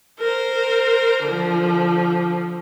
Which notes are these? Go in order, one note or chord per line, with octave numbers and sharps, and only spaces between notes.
A#4 C5
D3 F3